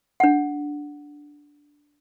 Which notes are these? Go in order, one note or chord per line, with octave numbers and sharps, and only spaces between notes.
D4 F#5